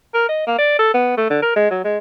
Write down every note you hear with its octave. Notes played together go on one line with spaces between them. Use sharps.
A#4
D#5
A#3
D5
A4
B3
A3
D3
A#4
G#3
F#3
G#3